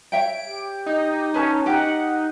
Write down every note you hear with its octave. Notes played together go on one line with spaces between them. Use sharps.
C#5 E5 G5 D7
G4
D#4
C#4 G#4 B4 A5
D#4 G4 F#5